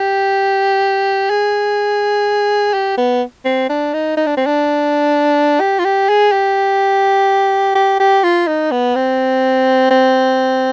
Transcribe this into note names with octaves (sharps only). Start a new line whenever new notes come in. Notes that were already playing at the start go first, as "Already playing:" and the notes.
Already playing: G4
G#4
G4
B3
C4
D4
D#4
D#4
D4
C4
D4
G4
F4
G4
G#4
G4
G4
G4
F4
D#4
B3
C4
C4